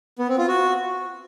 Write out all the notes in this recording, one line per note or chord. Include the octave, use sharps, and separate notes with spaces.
B3
C4
F4
F#4